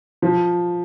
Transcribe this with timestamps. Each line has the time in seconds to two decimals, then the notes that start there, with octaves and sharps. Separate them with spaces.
0.22 F3